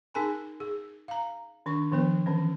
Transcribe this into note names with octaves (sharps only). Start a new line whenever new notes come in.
D#4 G#4 A#4 G#5 A5 B5
G#4
F5 A#5
D#3 D4 C#6
D#3 F3 B3 B4
D#3 E3 C#4